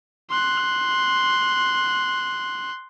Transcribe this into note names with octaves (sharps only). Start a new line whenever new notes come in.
C6 F#6